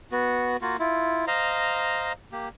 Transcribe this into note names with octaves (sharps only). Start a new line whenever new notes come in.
B3 F#4
A#3 F4 F#4
E4 F4
C5 D#5 F5 A#5
A#3 G4